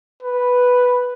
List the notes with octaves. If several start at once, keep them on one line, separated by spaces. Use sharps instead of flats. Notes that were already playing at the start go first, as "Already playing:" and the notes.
B4